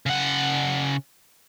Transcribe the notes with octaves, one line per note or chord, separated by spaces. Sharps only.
C#3 F#5